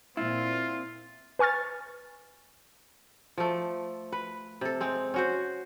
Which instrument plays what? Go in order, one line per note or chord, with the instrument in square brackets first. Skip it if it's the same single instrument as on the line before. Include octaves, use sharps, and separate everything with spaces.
[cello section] A#2 C4 [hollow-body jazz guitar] E4 [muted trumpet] F4
[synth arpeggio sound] B4 G#5 C#6 F6 A6
[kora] F3 A3
B4
C3 A4
G#3 C4
C#4 F#4 C5